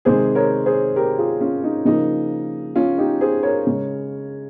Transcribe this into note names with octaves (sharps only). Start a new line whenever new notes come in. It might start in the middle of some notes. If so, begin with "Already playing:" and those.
C3 D#3 G#3 G#4 C5
A#4 C#5
G#4 C5
G4 A#4
F4 G#4
C#4 F4
D#4
C#3 F3 A#3 D#4
C#4 F4
D#4 G4
G#4 C5
A#4 C#5
C#3 G#3